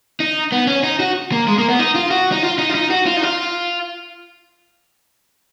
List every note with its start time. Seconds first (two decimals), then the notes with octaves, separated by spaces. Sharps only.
0.20 D#4
0.52 B3
0.67 C#4
0.84 D#4
1.00 F#4
1.32 A#3
1.48 G#3
1.58 A#3
1.69 B3
1.79 D#4
1.95 F4
2.11 F#4
2.32 D#4
2.43 F4
2.58 D#4
2.69 F4
2.75 D#4
2.91 F#4
3.06 F4
3.17 D#4
3.22 F4